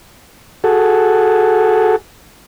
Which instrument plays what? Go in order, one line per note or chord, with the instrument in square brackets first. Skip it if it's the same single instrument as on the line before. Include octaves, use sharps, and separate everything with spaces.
[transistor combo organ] F#4 G#4 A4